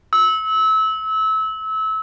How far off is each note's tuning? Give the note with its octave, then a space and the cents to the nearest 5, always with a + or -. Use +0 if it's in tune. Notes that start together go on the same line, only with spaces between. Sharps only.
E6 -25